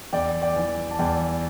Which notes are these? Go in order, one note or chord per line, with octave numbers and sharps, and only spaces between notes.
E2 D5 G5
D5 G5
E3
A5
E2 D5 G5